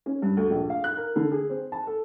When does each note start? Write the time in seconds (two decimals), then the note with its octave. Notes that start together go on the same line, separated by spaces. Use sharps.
0.06 C#4
0.22 G2
0.37 D2
0.50 A#1
0.70 F5
0.84 F#6
0.97 A#4
1.16 D3
1.32 G#4
1.50 C4
1.72 A5
1.87 A4